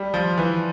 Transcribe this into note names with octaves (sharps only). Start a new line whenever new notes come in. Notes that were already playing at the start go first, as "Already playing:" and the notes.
Already playing: G3
F3
E3